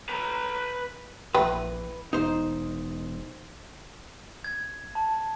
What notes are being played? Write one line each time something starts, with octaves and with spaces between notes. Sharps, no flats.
B4 A#5
A#1 E3 B4 G5
E1 D#4 C5
G#6
A5